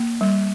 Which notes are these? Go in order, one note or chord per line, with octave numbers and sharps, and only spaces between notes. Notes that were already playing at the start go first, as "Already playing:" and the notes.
Already playing: A#3
G3